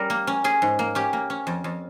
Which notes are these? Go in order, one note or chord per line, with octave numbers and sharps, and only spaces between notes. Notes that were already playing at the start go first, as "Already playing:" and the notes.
Already playing: G3 C#4 A#4
A#3
C#4
C#4 G#4
G#2
A#3
C#4 G4
A#3
C#4
F2
F2